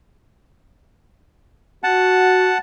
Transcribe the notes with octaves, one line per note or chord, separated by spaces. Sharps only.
F#4 F#5 A5